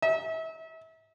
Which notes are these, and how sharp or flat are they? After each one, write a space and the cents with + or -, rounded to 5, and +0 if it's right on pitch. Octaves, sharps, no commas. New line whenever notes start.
E5 -35